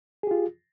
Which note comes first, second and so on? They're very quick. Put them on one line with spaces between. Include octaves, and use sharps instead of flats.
G#4 G4 F4